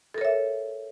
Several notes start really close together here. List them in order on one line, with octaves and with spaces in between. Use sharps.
A4 A#4 C#5 E5